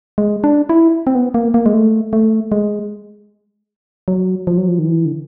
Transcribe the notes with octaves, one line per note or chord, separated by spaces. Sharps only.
G#3
D4
E4
C4
B3
A#3
A#3
G#3
A3
A3
G#3
F#3
F3
F#3
F3
D#3
E3
D3